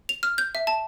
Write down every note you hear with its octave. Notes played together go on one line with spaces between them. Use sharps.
F7
F6
G6
E5
A5